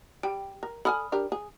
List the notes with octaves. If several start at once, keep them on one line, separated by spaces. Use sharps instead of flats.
G3 G5
A#4
A4 D5 G#5 B5 D#6 F6
D4 G4 A#4
G#4